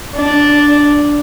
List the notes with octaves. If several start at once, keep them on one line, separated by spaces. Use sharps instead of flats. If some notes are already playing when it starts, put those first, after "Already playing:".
D4